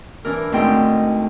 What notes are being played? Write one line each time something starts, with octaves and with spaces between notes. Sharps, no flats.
E3 C#4 D4 A#4
D2 G#2 C4 D#5 G5